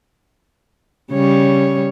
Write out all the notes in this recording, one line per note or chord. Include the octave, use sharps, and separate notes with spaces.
C#3 G3 C#5